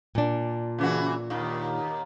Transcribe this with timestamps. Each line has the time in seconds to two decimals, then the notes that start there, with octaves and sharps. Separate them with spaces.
0.15 A#2 D4
0.78 C#3 E3 F#4
1.30 D#2 D#3